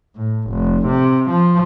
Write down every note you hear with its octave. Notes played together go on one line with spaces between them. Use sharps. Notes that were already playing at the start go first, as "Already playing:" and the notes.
A2
F1
C3
F3